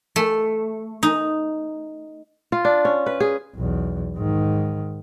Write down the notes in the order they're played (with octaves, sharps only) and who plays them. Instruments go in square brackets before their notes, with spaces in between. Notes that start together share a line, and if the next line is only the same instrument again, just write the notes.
[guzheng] A3
D#4
[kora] F4
D4
C#4
B4
G#4
[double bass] B1 E2
G#2 D#3